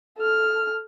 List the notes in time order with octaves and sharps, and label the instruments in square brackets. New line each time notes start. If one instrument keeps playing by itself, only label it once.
[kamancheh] A4 F6